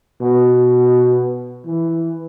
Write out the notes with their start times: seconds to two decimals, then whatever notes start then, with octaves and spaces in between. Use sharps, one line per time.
0.21 B2
1.66 E3